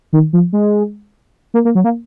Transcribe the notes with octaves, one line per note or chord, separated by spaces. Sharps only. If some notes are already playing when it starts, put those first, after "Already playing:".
D#3
F3
G#3
A#3
A#3
F#3
A#3